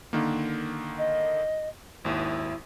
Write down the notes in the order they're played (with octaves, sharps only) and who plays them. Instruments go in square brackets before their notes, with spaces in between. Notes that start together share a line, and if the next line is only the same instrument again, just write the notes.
[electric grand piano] D3 D#3 A#3
[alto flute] D#5
[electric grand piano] G#1 D#2 [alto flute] E4